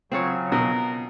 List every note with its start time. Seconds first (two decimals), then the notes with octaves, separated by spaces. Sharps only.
0.12 C#3 F#3 C4 F4 C#5
0.52 B2 A#4